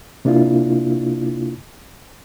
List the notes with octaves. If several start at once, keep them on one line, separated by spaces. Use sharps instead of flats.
C3 A#3 D4 E4 F4